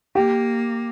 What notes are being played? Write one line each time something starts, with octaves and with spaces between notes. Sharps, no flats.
A#3 G4